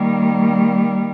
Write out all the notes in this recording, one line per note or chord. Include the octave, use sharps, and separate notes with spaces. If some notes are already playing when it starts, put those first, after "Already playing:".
Already playing: D#3 G3 A#3